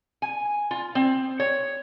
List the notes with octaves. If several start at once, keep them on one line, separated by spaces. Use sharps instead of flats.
G#5
F4
C4
C#5